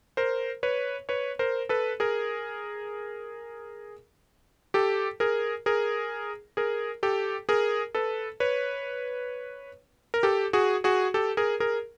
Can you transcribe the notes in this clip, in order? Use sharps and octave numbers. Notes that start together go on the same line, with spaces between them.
A#4 C5
B4 C#5
B4 C#5
A#4 C5
A4 B4
G#4 A#4
G4 A4
G#4 A#4
G#4 A#4
G#4 A#4
G4 A4
G#4 A#4
A4 B4
B4 C#5
A#4
G4 A4
F#4 G#4
F#4 G#4
G4 A4
G#4 A#4
G#4 A#4